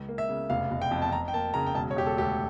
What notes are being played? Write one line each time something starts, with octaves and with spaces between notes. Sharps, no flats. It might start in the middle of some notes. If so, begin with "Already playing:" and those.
Already playing: C#2
A#3
E5
C#3
F1 F5
F1
G5
F2
A5
F2 A#5
G5
A#3 A5
C#3 A#5
G5
E1 A5
C#5
E1 G4
A4
D2 G4 A4